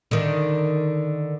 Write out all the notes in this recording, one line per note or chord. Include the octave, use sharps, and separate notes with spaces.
D3 D#3